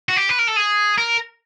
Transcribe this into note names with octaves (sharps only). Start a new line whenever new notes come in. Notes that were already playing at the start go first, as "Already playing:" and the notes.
F#4
G4
B4
A#4
A4
G#4
A#4